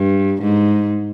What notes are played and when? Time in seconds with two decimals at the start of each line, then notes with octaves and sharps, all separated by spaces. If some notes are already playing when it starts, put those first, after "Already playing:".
Already playing: G2
0.42 G#2